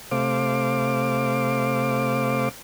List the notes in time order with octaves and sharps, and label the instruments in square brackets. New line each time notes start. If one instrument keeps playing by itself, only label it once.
[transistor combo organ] C3 A3 C5 F5 D6